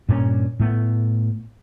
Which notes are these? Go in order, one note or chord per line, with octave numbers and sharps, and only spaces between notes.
G2 A#2 A#3 C#4
A2 A3 B3